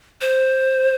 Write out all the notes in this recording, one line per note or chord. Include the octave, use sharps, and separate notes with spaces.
C5